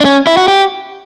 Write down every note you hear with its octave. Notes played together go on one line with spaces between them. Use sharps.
D4
C#4
E4
F#4
G4